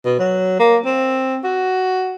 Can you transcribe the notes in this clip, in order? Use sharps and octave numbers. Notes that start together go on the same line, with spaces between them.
B2
F#3
A#3
C4
F#4